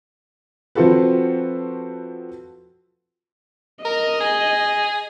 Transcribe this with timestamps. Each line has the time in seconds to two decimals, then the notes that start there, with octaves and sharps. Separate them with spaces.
0.75 F3 C4 F4 F#4 A4 B4
3.85 A#4 D#5
4.20 G#4